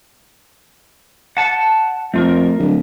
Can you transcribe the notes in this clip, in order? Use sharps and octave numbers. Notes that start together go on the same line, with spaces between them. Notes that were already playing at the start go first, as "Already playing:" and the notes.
F#5 A5
F2 A3 F4 A#4
D1